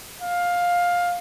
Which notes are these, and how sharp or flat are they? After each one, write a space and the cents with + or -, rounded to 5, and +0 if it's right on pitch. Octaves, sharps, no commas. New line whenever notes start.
F5 +15